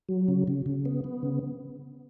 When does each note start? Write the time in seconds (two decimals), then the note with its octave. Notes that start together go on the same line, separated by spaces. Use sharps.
0.09 F#3
0.28 C#3
0.48 C#3
0.66 C#3
0.85 B3
1.04 B3
1.23 C#3